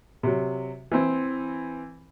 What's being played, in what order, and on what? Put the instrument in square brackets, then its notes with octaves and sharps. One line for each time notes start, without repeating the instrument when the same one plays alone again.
[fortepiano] C3 F#3
E3 C4